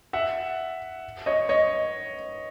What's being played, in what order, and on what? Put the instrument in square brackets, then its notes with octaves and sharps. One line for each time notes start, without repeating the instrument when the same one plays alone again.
[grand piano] E5 F#5
C#5 D#5
C#5 D#5